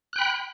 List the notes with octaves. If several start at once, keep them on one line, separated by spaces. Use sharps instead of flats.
G5 B5 F#6